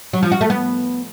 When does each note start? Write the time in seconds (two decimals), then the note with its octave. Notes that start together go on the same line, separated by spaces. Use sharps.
0.13 F#3
0.23 F3
0.32 F#4
0.41 A3
0.50 B3